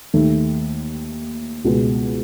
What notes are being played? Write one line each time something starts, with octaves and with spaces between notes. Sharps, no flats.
D#2 D#3 A3
C#2 B2 G#3